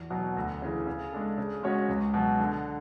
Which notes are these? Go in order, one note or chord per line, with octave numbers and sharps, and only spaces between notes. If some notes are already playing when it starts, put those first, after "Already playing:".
Already playing: E2
B2 F#3
D2
C#3 E3
C#3
G#3 D4 A4
C#3
G#3 C#4 F#4 C#5
C#2
B2 F#3
D3